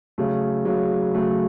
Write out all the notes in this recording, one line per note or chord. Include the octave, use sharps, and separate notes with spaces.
C#3 F#3 A3
C#3 F#3 A3
C#3 F#3 A3